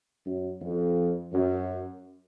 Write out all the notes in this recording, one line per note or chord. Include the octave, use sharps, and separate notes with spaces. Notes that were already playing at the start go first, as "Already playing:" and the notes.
F#2
F2
F#2